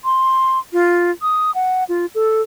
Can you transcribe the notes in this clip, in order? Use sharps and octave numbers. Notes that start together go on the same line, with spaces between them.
C6
F4
D#6
F#5
F4
A4